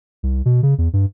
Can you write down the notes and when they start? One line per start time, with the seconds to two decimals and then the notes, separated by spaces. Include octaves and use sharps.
0.23 C2
0.45 B2
0.63 C#3
0.78 E2
0.93 G2